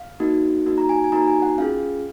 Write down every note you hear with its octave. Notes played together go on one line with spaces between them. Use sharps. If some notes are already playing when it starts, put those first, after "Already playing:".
Already playing: F5
A#3 D#4 F#4
A#3 D#4 F#4
A#5
G#5
G#5
A#3 D#4 F#4 A#5
G#5
F#5
C#4 F4 G#4 F5